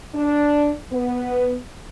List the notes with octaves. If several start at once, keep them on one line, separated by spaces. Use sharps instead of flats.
D4
B3